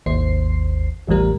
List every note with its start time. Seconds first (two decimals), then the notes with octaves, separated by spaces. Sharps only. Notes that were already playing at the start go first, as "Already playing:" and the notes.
0.06 G#1 D#2 C5 C7
1.07 A1 E2 A2 G3 A#4